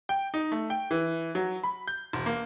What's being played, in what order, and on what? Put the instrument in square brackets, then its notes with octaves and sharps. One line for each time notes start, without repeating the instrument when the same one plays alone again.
[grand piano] G5
D#4
A3
G5
E3
F#3
B5
G6
E1
A#3